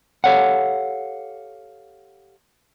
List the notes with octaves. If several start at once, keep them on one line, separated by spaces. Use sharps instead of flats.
G4 A4 C#5 F5 F#5